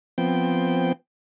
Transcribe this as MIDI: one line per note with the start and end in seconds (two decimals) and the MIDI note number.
0.18 0.92 53
0.18 0.92 59
0.18 0.92 60
0.18 0.92 79